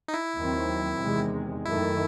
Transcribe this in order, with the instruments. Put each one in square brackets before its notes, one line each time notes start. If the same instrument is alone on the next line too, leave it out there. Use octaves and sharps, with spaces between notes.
[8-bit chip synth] D#4
E4
[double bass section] D#2 D#3 F#3 C4
E2 C3 D#3 G#3
[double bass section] F#2 D#3 A3 [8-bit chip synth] E4